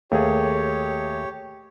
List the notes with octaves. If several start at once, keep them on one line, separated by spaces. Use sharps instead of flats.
D#2 A3 G4 G#4 C#5